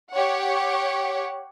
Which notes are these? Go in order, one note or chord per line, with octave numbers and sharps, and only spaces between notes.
G4 C#5 F#5